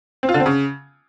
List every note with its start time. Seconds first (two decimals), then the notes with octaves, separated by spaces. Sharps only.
0.23 C4
0.29 F4
0.34 D3
0.40 C4
0.46 C#3